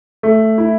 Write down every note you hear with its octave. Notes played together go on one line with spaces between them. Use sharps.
A3
E4